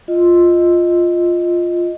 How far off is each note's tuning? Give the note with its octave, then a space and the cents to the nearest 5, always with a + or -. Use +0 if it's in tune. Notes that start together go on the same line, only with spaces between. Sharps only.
F4 +0 D#5 +0